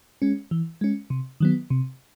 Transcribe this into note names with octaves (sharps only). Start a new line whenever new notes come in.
G#3 C#4
E3
G#3 C#4
C3
D#3 F#3 B3
C3